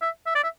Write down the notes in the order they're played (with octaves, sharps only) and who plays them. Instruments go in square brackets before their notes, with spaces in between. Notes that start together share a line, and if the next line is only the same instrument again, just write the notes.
[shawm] E5
E5
D5
E5